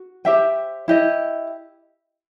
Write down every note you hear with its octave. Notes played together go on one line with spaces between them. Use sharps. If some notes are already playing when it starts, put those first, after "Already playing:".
Already playing: F#4
G4 C5 E5 G5
E4 G4 D#5